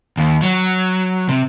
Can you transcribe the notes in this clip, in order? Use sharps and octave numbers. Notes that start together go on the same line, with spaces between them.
D#2
F#3
C3